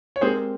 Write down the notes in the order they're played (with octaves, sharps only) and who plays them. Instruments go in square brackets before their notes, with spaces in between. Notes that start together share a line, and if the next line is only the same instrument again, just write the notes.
[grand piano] C#5
[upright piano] G#3 C4 G4 A#4 [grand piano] G#4 C5